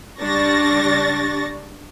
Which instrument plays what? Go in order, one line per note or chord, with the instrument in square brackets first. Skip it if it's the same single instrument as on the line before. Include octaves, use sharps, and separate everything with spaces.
[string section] C#2 G3 D4 C#6 A6 A#6